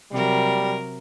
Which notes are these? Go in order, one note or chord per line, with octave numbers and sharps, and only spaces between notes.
C3 F#3 G3 A#4